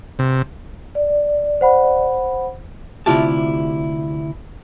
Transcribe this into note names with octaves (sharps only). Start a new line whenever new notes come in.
C3
D5
C5 F#5 B5
D2 C3 E4 F4 G4 A5